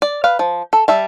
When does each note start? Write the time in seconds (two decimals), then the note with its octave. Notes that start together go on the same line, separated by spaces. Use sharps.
0.02 D5
0.24 B4 F5
0.39 F3
0.73 A4
0.88 G3 E5 A5